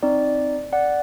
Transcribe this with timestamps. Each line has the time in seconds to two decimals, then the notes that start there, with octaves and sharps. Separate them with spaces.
0.03 C4 D#4 D5
0.72 D5 F#5